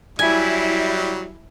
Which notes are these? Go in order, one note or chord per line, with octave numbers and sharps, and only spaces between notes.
F#3 G3 E4 G#5